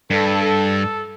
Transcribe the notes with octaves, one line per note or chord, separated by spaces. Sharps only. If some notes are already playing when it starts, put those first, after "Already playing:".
G2 A4